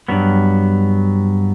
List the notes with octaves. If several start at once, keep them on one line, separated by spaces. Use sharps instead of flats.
G2 F#3 B3